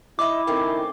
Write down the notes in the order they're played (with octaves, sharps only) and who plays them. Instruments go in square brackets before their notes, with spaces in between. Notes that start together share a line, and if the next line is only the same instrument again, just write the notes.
[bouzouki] D#4 D#5 E5 [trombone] E4 [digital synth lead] D6
[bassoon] D#3 [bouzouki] A3 C4 C#4